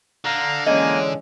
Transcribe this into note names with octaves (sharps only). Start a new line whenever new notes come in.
D3 F5 A#5
E3 G#3 A#3 C#4 D#5 G#5